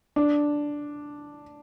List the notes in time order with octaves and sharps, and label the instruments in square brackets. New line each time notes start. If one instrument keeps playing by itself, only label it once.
[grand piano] D4